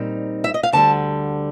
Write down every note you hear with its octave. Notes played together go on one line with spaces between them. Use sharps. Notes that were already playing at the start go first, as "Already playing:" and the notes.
Already playing: A#2 G3 C4 D#4
E5
D#5
F5
D2 D3 G3 A5